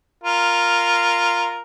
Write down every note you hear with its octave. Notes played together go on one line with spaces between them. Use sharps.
F4 A#4